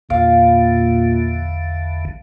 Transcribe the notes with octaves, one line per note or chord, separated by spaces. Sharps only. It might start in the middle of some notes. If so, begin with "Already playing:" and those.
A1 E2 A#2 D3 F5